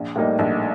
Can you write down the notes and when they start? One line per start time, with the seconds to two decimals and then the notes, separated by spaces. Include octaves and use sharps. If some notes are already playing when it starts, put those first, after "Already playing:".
Already playing: A#1
0.16 A2 G3 A#3 D#4
0.39 A#1